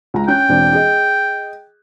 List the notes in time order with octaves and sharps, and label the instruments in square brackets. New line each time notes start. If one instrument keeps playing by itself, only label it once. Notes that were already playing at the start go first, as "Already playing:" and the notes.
[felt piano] C#2 A#5
[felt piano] C#4 F#6 G6 [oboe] G5
[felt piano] E1 C4 D4
G#4 D#5